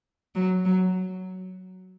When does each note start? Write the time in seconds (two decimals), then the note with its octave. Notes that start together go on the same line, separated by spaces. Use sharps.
0.35 F#3
0.65 F#3